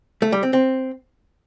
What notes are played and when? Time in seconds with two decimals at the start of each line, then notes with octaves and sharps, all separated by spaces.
0.22 A3
0.32 G3
0.43 C4
0.53 C4